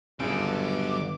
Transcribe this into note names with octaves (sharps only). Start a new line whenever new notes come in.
G1 C#2 F#3 E4 G#4 A4 D6